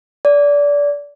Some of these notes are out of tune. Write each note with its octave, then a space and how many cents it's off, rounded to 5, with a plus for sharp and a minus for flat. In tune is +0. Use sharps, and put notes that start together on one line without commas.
D5 -25